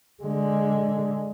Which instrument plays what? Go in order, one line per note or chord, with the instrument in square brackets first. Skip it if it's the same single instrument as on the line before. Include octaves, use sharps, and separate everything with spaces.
[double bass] D3 G#3